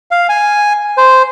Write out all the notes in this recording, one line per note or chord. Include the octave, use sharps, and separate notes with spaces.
F5
G#5
C5